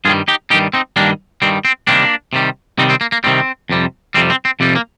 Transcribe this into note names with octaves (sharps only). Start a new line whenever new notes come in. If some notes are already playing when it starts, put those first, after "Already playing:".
G2 D#3 G3 F4 G#4
D#4 G4
G2 D#3 G3 D#4 G4
C4 D#4
G2 D#3 G3 A#3 D4
G2 D#3 G3 C4
C4
C3 D#3 G3 A#3 D4
C3 D#3 G3
C3 D#3 G3 C4 D#4
C4
A#3
A#3
C3 D#3 G3 C4
F2 C3 G3
F2 C3 G3 C4
C4
C4
F2 C3 G3
A#3